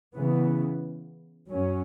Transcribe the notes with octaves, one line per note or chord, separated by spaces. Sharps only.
C#3 E3 B3
F#2 F#3 C#4